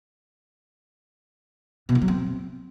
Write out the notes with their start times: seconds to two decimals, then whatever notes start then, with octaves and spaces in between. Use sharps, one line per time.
1.89 B2
1.95 D#3
2.02 F#3
2.08 C4